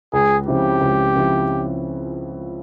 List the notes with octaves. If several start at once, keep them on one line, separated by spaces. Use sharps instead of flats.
C#2 G#4
C#3 F3 C4 E4 G4
C#2
C#3 F3 C4 E4